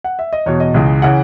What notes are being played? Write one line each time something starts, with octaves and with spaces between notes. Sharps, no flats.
F#5
E5
D#5
E2 B2 C#5
D#5
C#2 C#3 E3
C#3 E3 F#5